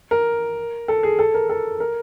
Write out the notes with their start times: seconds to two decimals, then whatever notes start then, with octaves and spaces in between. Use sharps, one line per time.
0.11 A#4
0.88 A4
1.03 G#4
1.19 A4
1.34 A#4
1.50 A4
1.80 A#4